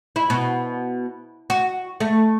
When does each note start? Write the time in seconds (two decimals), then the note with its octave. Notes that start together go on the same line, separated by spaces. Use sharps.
0.16 E4
0.30 B2
1.50 F#4
2.00 A3